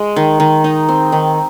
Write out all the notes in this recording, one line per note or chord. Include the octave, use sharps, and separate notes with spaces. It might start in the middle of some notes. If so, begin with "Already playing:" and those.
Already playing: G#3
D#3
D#3
D#4
C4
D#3